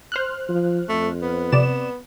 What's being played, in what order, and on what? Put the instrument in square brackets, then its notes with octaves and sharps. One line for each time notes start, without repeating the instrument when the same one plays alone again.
[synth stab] C5 F6 F#6
[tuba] F3
[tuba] F2 [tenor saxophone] A3
[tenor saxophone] B3
[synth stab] C3 D5 E7